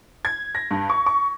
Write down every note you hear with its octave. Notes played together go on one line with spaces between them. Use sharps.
G#6
A#6
G2
C#6
C#6